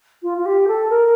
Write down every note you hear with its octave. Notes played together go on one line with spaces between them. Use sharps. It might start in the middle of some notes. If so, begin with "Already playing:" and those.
F4
F4
G4
A4
A#4